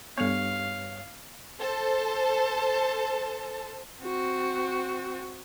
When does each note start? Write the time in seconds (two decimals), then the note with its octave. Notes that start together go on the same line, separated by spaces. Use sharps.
0.18 G2 B3 A4 C#5 F5
1.59 A4 C5 A5
4.02 C4 F#4